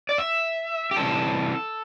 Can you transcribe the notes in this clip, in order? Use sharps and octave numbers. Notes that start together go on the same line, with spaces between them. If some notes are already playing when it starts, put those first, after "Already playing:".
D5
E5
G4
C3 E3 G3 A4